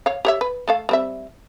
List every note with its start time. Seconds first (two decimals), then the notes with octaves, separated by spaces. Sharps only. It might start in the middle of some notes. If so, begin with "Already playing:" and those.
0.06 C#5 F5
0.25 G4 C#5 E5
0.41 B4
0.68 A3 A4 F5
0.89 G3 C4 E5